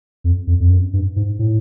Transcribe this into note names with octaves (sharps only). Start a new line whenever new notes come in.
F2
F2
F2
F#2
G2
G#2
A2